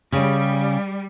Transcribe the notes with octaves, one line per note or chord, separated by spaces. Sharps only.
C#3 G3